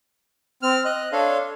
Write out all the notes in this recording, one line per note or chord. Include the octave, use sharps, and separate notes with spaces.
C4 F6
D#5 F#6
D4 A4 C#5 F5 C6